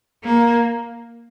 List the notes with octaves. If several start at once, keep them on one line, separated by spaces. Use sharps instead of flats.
A#3